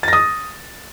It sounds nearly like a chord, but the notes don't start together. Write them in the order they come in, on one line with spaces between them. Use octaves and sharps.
A6 A#6 D#6